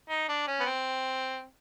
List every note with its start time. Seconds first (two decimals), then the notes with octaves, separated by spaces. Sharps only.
0.10 D#4
0.29 D4
0.47 C#4
0.60 B3
0.66 C4